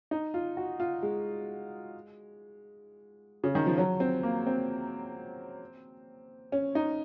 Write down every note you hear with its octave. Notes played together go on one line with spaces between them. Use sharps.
D#4
F4
F#4
F4
G#3
C#3
D#3
F3
F#3
C4
A#3
C4
C#4
D#4